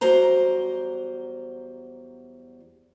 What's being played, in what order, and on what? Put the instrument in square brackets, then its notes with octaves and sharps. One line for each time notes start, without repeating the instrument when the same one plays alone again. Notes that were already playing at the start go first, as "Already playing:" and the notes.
[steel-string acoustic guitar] E2 F#3 G3 C5 A#5